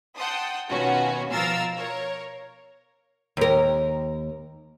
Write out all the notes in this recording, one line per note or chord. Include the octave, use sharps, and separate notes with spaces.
F#5 G5 A5 C6 D#6
B2 D#3 B3 C#4 F4 F#4
B2 F3 A#4 F5 E6 A6
A#4 C#5 F5
D#2 A#4